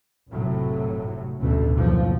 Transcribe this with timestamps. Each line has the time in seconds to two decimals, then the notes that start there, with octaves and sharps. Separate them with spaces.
0.29 F1 A2 C3 F#3
1.40 A1 D2 B2 A3
1.74 F#1 B1 F3